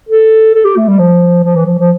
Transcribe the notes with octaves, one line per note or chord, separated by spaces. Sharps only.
A4
A4
G4
A3
G3
F3
F3
E3
F3
F3